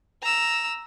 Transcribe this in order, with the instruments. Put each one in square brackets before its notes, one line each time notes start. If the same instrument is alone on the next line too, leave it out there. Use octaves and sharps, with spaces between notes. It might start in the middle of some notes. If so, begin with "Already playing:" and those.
[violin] A#5 E6